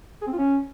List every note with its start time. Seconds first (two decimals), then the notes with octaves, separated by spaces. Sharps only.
0.22 G#4
0.27 C4
0.33 F4
0.38 C#4